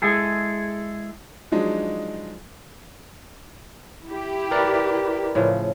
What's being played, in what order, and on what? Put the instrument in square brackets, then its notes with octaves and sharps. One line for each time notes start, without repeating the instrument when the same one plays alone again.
[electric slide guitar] G#3 E4 G#4 A4
[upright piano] F3 F#3 G#3 D4 D#4
[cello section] E4 G4
[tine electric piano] A#4 B4 D5
[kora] A2 C#3 F3